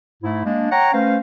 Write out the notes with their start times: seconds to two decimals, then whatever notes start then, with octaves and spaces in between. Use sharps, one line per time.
0.22 G#2 A3 E4
0.45 G#3 A#3 D4
0.71 C#5 F#5 G5 A#5
0.93 A3 C#4 B4 C5 F5